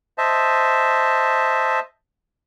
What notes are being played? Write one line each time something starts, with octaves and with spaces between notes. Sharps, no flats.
C5 D#5 E5 A5